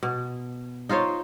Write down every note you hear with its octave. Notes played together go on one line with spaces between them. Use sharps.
B2
D#4 F4 C5 C#5